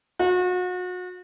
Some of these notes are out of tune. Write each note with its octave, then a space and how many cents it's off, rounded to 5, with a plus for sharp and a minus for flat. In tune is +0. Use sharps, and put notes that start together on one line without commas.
F#4 -35